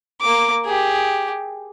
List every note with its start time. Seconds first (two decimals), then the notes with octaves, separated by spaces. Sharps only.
0.21 A#3 D6
0.65 G4 G#4